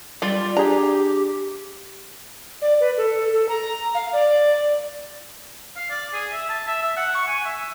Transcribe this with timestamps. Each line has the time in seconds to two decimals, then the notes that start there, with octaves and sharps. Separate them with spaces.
0.22 G3 F4 D5 A6
0.57 D4 G4 G#4 A#5
2.62 D5
2.80 B4
2.97 A4
3.33 A4
3.49 A#5
3.95 F5
4.13 D5
5.76 F5
5.90 D5
6.13 G#4
6.32 E5
6.49 A5
6.66 E5
6.83 E5
6.97 F#5
7.15 C#6
7.28 G#5
7.45 E5